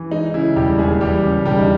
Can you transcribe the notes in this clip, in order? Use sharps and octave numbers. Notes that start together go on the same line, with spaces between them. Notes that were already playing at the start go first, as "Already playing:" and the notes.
Already playing: E3
G#3 D#4
C#3 E4
E1 G3 G4
D#2 G#3 G#4
E3 G3 G4
C#3
E1 G3 G4
D#4